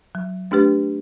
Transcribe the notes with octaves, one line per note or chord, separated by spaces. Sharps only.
F#3
A3 D4 G4 B4